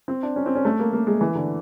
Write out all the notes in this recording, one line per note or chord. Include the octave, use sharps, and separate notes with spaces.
C4
D4
C#4
C4
C#4
A3
A#3
A#3
G#3
E3
D3